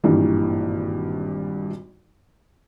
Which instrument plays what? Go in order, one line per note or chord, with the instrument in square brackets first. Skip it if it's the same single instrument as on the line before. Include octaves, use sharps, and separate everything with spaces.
[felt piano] G#1 G2 A#2 D#3 E3 G3